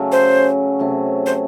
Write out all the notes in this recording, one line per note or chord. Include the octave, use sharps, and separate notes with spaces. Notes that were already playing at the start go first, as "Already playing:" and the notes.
Already playing: C#3 F#3 A3 C#4
C5
C3 F#3 A3 C#4
C5